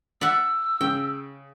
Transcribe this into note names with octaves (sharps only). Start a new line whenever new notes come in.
D5 E5 F#5 E6
C#3 G5